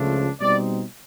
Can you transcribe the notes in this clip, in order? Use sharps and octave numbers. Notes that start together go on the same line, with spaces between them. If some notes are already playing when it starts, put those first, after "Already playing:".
Already playing: C#2 C#3 F3 A3 D4
B2 G3 C4 D#4 D5